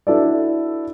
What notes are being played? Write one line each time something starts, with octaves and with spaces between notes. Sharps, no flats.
D4 E4 F#4 A4 B4 D5